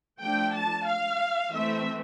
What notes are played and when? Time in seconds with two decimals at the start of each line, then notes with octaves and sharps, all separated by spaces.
0.21 F3 A3 D4 G5
0.54 A5
0.87 F5
1.51 E3 A3 C4 E5